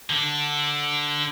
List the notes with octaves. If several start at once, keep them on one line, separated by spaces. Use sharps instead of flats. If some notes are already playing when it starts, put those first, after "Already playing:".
D3 D4